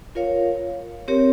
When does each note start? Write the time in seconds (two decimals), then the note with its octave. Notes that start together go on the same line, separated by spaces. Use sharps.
0.15 F4 A#4 C#5 F5
1.08 C4 G4 A#4 C#5